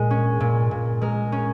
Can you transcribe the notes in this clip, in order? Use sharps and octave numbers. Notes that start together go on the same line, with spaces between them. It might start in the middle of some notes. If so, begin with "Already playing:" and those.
Already playing: A#2 G#3
C#4
A#2
A#2
G#3 A#4
C#4